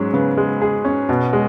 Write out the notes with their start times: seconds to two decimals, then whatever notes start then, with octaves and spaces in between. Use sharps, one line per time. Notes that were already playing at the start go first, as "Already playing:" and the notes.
Already playing: G#2 F#3 G#3 C#4 G#4
0.13 C#3 B3
0.37 G#3
0.62 G#4
0.85 C#4
1.09 B2 B3
1.33 G#3